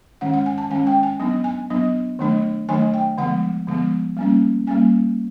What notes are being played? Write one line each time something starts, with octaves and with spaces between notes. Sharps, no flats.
D#3 G#3 C#4 F#5
F#5
G#5
A5
D#3 G#3 C#4 G#5
G5
G#5
F#3 B3 D4
G#5
F#3 B3 D4
D#3 F#3 A3 D4
D#3 F#3 A3 D4 G#5
G5
D3 F3 G#3 B3 F#5
D3 F3 G#3 B3
G3 A#3 C#4
G3 A#3 C#4 G#5